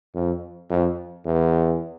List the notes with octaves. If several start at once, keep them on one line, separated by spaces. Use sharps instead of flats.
F2
F2
E2